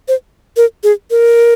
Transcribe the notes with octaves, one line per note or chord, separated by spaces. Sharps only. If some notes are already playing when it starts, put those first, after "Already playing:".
C5
A#4
G#4
A#4